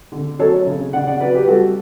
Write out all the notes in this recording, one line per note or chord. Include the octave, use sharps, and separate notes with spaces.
D3
F#3 A4 C#5
C#3
C#3 D5 F#5
D5 F#5
F#3 B4 D5
G4 B4
G3 F#4 A4